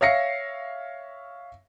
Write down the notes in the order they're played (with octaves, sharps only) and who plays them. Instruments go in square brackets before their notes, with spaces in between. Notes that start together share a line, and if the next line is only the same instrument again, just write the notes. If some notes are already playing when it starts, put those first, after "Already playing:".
[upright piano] C#5 E5 F5 A#6 C7 C#7